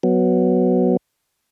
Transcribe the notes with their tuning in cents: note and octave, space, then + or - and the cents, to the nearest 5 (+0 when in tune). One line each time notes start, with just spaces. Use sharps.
F#3 +0 B3 +0